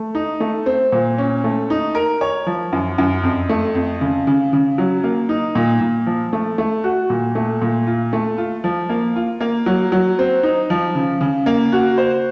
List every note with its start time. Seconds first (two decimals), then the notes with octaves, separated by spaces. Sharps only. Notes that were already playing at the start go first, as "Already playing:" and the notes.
Already playing: A3
0.15 D#4
0.40 A3
0.66 C4
0.92 A#2
1.18 C#4
1.44 A3
1.70 D#4
1.95 A#4
2.21 C#5
2.47 F3
2.73 F#2
2.98 F#2
3.23 F2
3.49 A3
3.75 F2
4.01 C#3
4.27 C#3
4.53 C#3
4.78 F#3
5.04 A#3
5.29 D#4
5.55 A#2
5.81 A#2
6.06 F3
6.33 A3
6.58 A3
6.84 F#4
7.10 A#2
7.35 A3
7.62 A#2
7.87 F4
8.13 A3
8.38 F4
8.64 F3
8.89 A#3
9.16 F4
9.40 A#3
9.66 F#3
9.92 F#3
10.19 C4
10.43 D#4
10.70 F3
10.95 C#3
11.21 C#3
11.46 A#3
11.72 F#4
11.98 C5